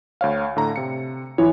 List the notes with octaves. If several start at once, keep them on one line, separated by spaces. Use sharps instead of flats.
D2 C#5 F5
A2 D3 A#5
C3 C#7
E3 C#5